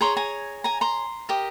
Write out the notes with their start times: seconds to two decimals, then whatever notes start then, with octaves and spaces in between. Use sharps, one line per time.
0.01 G#4 C#5 A#5 C6
0.17 G#5 A#5
0.64 G#5 A#5
0.81 A#5 C6
1.29 G4 A#4 D#5